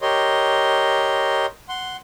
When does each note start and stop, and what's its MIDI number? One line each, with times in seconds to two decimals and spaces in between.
0.02 1.46 67
0.02 1.46 70
0.02 1.46 73
0.02 1.46 75
0.02 1.46 84
1.69 1.97 78
1.69 1.97 84